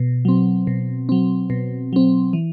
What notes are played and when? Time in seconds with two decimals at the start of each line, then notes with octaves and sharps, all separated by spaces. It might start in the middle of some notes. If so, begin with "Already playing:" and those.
Already playing: B2
0.25 F#3 C4
0.67 B2
1.09 F#3 C4
1.50 B2
1.93 F#3 C4
2.33 E3